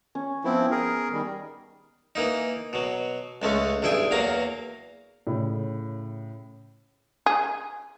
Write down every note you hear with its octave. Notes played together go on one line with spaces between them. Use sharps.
C#4
F3 B3 C4 E4
G#4 A#4
D#3 G3
E3 A#3 D#4
B2 F#3
C#2 G#3 A3 C#4
B1 G2 E4 G#4 G5 G#5
E2 F#3 A#3 F5 A#5
A2 C#3
G#4